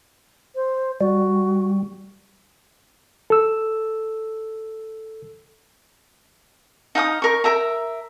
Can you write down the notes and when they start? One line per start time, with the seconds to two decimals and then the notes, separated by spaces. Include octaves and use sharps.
0.55 C5
1.01 G3 F#4
3.30 A4 E6
6.95 D#4 F5 G5 D#6
7.22 A#4 C#6
7.44 A#4 E5 A#5